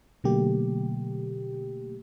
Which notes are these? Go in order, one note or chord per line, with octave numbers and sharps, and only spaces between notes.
B2 D3 F#3 A3 A#3 G4